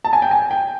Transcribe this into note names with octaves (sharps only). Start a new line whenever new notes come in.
A5
G#5
G5
G#5
G5